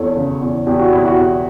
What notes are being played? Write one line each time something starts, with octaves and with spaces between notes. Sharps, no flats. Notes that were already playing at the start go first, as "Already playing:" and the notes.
Already playing: E2 A4 C#5
C#3
E2
E2 G4
F#4
E2 E4
F#4
E2